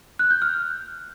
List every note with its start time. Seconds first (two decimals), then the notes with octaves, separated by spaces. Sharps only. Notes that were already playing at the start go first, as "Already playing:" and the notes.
0.19 F#6
0.31 G6
0.42 F6